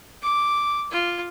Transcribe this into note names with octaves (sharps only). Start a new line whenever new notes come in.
D6
F4